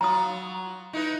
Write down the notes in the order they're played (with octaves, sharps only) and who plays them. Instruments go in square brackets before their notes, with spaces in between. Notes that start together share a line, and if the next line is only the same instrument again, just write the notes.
[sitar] F#3 F4 [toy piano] A#5 D#6
[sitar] D#4 E4 B4